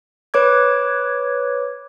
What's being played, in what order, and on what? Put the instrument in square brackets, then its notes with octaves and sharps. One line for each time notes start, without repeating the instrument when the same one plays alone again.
[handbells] B4 C#5 D6 G#6